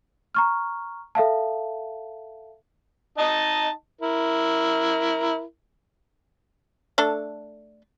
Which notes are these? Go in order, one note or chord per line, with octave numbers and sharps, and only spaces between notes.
A#5 C#6 F6
A4 E5 F5 A5
D#4 D#5 A5
E4 A#4
A3 D4 A4